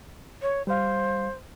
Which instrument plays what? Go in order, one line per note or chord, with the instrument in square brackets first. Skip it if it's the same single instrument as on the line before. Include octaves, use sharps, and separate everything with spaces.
[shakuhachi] C#5
[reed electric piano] G3 F5 [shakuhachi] C5